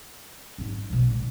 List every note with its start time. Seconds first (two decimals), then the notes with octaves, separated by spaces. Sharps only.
0.58 G#2 C4
0.90 B1 B2
1.10 A#2 G#3